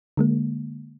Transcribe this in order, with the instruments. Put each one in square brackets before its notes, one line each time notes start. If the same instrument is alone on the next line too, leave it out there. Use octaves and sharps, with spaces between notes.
[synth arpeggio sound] D3 G#3 A#3